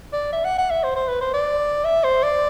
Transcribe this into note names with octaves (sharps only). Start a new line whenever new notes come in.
D5
E5
F#5
F#5
E5
C5
C5
B4
C5
D5
E5
C5
D5